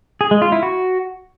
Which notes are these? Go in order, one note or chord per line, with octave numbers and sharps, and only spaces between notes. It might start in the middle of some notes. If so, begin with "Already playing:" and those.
G#4
G#3
F4
E4
F#4